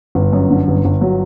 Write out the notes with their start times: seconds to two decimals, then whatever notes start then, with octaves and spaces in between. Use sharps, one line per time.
0.15 G1
0.33 F#2
0.50 D3
0.68 G1
0.85 G1
1.01 F#3